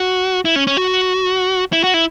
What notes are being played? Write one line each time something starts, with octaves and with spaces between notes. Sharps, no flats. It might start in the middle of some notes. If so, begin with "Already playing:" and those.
Already playing: F#4
E4
C#4
C#4
F#4
E4
F#4
E4